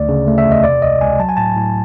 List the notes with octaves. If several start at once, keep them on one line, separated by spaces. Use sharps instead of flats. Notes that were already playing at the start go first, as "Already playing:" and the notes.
Already playing: D2 D5
C#3
A3
E5
E2
D#5
C3 D5
C#2 D#5
C#2 G#5
F#3 A5
G#5
A2 A5
A2